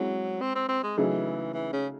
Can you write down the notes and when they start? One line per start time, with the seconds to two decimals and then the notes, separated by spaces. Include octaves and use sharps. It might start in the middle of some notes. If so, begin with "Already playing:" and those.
Already playing: F#3 G#3 C4 E4 G#4
0.42 C4
0.56 C4
0.69 C4
0.84 G#3
0.98 C#3 E3 F#3 A3 D#4 G#4
1.54 E3
1.73 C#3